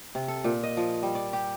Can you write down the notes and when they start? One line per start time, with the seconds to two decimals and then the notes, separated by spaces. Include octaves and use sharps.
0.15 C3
0.28 A4
0.44 A#2
0.63 D#5
0.77 F3
1.03 G3
1.15 D5
1.33 G4